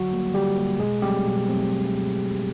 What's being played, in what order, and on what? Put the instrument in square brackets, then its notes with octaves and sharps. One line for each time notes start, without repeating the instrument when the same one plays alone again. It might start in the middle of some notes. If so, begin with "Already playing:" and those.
Already playing: [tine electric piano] D3 F#3 F#4
G3 A#3
D3 G3 G4
G3 A#3
B2 G#3 G#4
F#3 G3 A3 C4 G4
B2
F#3 A3 C4